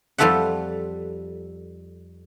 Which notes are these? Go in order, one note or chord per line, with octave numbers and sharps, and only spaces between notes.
F2 G3 F4 A4 E5 F#5